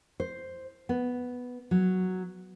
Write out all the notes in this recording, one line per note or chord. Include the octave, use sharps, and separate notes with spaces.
C5
B3
F#3